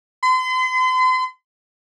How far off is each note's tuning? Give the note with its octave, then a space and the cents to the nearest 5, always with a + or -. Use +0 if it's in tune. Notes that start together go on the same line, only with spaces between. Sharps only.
C6 -40